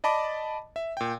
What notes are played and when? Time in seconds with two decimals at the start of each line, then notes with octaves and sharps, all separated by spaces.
0.04 D5 D#5 A5 B5 D6
0.76 E5
0.97 A#2 G5